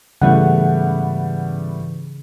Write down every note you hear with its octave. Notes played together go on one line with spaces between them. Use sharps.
G#2 C#3 E3 G3 A3 B3 F#5